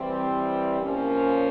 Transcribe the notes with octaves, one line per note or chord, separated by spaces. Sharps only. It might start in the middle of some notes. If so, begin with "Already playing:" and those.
Already playing: E3 G3 C4
A#2 F3 A#3 C#4